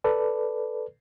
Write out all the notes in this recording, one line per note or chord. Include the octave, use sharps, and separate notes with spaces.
A4 B4 D5